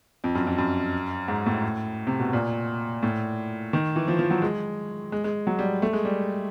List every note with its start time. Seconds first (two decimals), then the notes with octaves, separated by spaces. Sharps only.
0.24 F2
0.35 F#2
0.47 F2
0.58 F#2
1.28 G#2
1.46 A2
2.07 C3
2.19 B2
2.33 A#2
3.03 A2
3.73 D#3
3.96 E3
4.08 F3
4.19 F3
4.31 F#3
4.42 G#3
5.12 G#3
5.24 G#3
5.47 F#3
5.59 G3
5.82 A3
5.93 G#3
6.05 G3